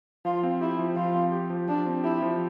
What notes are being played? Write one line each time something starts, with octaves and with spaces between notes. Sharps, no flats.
F3 F4
C4
E4 G4
F3
F3 F4
C4
G4
F3
F3 D4
C4
E4 G4
F3